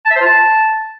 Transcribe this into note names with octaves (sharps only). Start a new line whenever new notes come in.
A5
E5
C5
F4
A5